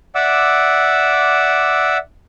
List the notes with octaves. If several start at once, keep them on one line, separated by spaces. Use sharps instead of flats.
D5 E5 F#5 D6 E6